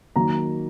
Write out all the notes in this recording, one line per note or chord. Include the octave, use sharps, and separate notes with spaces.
D#3 F#3 A#3 A#5